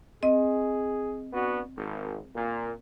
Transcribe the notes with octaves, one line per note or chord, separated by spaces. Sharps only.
C4 G#4 D#5
B3 D4 F#4
G#1
A#2